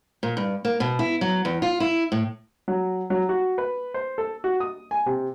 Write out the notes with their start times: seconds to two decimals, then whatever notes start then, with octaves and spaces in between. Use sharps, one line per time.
0.23 A#2
0.37 G2
0.65 A#3
0.80 B2
0.99 E4
1.21 F#3
1.45 E2
1.62 F4
1.80 E4
2.12 A2
2.68 F#3
3.10 F#3
3.29 F#4
3.58 B4
3.94 C5
4.18 A4
4.44 F#4
4.60 D#6
4.91 G#5
5.06 C3